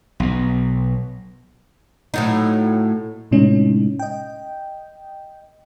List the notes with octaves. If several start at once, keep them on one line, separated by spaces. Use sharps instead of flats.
B1 B2
A2 F#3 D#4
A2 C3 G#3 C#4 D#4 E4
D#5 G5